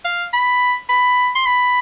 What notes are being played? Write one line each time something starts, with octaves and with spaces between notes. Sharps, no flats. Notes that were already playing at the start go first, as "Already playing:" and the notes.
F5
B5
B5
C6
B5